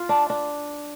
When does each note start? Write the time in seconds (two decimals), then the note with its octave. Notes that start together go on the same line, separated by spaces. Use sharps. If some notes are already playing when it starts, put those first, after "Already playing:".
Already playing: F4
0.09 D4 A5
0.30 D4